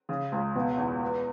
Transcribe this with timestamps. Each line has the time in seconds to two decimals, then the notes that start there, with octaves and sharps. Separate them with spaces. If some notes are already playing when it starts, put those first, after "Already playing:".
0.09 C#3
0.32 C#2
0.55 B2
0.78 E2
1.02 B3